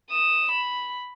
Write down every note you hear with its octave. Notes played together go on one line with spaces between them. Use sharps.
D#6 E7
B5